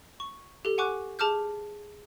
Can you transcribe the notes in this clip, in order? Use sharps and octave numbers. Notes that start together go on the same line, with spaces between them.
C#6
G4 A4
F#5 G#5 C#6 D6 F#6
G#4 A5 D6 F6 G6